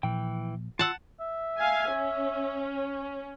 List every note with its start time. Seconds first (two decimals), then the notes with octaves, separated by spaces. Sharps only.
0.03 A#2 E3 F3 G5
0.79 F4 F#5 A5 E6
1.20 E5
1.58 F5 G#5
1.90 C#4